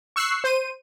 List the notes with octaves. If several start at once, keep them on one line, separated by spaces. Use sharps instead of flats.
C#6 E6 F#6 C7
C5 D#7